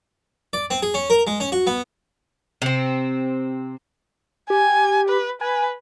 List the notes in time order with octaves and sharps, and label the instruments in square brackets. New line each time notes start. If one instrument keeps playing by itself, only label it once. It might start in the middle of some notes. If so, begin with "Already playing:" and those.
[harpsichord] D5
C4
G#4
C#4
A#4
G#3
C#4
F#4
B3
[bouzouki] C3 C4
[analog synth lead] G4 [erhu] G#5
[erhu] B4
[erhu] B4 [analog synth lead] G#5